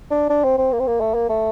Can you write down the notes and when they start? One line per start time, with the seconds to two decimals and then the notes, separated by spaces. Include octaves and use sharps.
0.11 D4
0.30 D4
0.44 C4
0.58 C4
0.72 A#3
0.80 C4
0.87 A#3
1.00 A3
1.14 A#3
1.29 A3